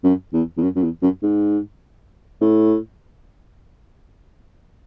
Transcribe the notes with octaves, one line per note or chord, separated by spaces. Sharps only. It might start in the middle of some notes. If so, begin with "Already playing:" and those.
F#2
E2
E2
F#2
F#2
E2
F#2
G#2
A2